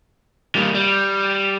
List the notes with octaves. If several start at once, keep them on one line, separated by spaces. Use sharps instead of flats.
G3 A#3
G3